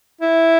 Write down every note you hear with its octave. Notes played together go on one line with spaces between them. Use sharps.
E4